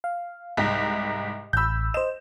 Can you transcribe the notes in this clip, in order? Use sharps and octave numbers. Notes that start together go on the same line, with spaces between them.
F5
C2 G#2 A#6 B6
A1 B5 E6 G6
C5 D#5 E7